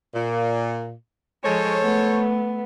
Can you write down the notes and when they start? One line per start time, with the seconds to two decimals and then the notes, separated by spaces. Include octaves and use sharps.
0.14 A#2
1.44 F3 G#3 A4 C5 C#5
1.82 A3 B3